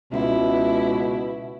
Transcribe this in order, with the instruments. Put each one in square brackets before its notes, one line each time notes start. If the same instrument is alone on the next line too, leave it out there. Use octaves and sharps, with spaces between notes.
[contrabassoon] C#2 [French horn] B2 [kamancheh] E4